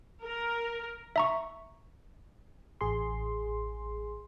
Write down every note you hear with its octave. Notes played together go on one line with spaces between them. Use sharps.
A#4
E5 A#5 C#6
A1 G#4 C6